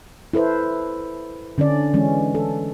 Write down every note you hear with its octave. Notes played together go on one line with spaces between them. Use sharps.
E4 A4 B4 C5
D3 C#4 D4 D5
E3 G#3 C#4
A4